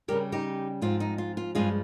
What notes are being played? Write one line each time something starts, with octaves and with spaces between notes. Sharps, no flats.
C#3 G3 C#4 G4 A#4
D#4 G4
G#2 F3 C4 F4
D#4
F4
F4
G2 F3 G#3 F4 G#4